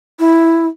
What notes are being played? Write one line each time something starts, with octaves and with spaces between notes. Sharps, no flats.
E4